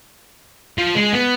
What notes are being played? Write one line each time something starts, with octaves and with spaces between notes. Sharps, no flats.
F3
G#3
B3